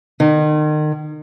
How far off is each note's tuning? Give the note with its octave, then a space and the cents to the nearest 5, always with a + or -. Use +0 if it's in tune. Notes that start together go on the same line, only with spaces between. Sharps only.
D#3 -35